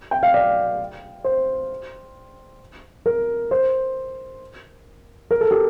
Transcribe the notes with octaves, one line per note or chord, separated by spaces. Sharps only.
G5
F5
D5
C5
A#4
C5
A#4
A4
G4